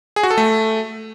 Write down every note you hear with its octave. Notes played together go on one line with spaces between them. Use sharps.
G#4
F#4
A4
A3